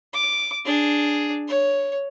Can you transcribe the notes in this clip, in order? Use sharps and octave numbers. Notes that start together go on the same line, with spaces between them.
D6
D4 G#4
C#5